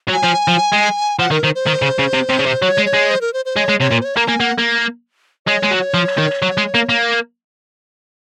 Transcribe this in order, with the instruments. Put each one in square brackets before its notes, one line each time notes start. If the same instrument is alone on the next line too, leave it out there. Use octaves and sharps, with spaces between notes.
[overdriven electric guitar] F#3
[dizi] G#5
[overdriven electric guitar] F3
F3
G#3
[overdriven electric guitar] F3 [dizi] F#5
[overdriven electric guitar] D#3 [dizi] A#4
[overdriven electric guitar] D#3 [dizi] C5
[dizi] C5
[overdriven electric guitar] D#3
C#3
C#3
C3
C3
C#3
C3
[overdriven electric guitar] F#3 [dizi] C#5
[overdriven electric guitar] G#3
[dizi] C#5
[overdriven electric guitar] G#3
[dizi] C5
A#4
C5
C5
[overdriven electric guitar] G#3 [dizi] C#5
[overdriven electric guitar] G#3
[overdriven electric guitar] C3 [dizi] C#5
[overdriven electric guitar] A#2
[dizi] C5
C#5
[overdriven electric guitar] A#3 [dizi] A#5
[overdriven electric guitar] A#3 [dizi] G#5
[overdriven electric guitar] A#3 [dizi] F#5
[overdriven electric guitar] A#3
[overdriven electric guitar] G#3 [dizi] C#5
[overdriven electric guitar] G#3
F#3
F3
D#3
F#3
G#3
A#3
A#3